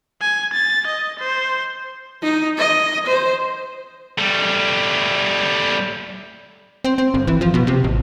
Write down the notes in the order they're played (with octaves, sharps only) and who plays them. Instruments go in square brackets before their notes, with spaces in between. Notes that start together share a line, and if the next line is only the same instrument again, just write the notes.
[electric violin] G#5
A6
D#5
C5
[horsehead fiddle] D#4
D#5
C5
[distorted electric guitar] G3 A3
[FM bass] C4
C4
G1
E3
F3
B2
C3
A1